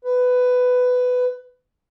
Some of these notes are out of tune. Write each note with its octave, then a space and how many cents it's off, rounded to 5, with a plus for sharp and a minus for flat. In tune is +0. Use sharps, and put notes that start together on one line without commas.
B4 +15